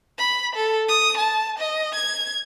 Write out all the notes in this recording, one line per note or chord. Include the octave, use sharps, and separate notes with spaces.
B5
A4
D#6
A5
D#5
G#6